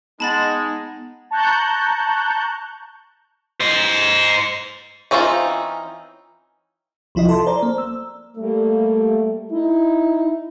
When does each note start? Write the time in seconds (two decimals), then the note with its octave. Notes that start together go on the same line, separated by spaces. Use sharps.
0.20 G#3 B3 D#4 F#5 A5 B5 A6
1.31 A5 A#5 C#6 F#6 G6
3.60 C5 D#5
5.11 E3 C4 C#4 D#4 F4
7.15 C2 F3 E4 F4 D#5
7.29 A4 A5 C6
7.47 C5 D5 A#5
7.63 A#3
7.78 E6
8.37 G3 A3 A#3
9.52 D#4 E4